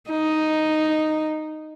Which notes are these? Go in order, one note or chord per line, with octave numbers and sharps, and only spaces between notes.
D#4